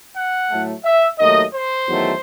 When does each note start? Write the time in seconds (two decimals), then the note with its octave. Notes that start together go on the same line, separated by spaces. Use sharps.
0.15 F#5
0.50 A2 F#3 A3
0.85 E5
1.19 D#2 D#3 F#3 A3 D#5
1.54 C5
1.88 E2 D#3 F#3 A3